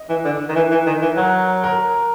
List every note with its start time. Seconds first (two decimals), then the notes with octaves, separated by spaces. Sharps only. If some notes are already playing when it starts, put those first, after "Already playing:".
Already playing: D#5
0.09 E3
0.25 D3
0.49 D#3
0.55 E3
0.71 E3
0.87 D#3
1.02 E3
1.16 F#3 A#4
1.64 A#4